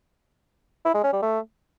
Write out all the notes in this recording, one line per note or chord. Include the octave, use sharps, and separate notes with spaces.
E4
G#3
C#4
G3
A3